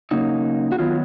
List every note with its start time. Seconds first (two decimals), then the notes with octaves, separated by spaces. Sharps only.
0.11 C#3 F#3 A#3 D#4
0.72 F#4
0.78 D#3 F#3 B3 F4